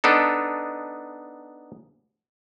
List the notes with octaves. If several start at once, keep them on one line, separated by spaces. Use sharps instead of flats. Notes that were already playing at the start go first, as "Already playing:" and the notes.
B3 D4 D#4 A4